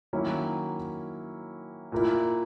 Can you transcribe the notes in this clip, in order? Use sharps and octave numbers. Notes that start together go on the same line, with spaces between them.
D#3 F#3 A#3 C#4 E4
A#2 A#3 E4